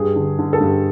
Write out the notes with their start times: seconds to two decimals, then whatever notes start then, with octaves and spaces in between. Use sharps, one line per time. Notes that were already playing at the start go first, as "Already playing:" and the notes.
Already playing: G2 G#4
0.16 D3
0.39 D3
0.53 A4
0.61 G2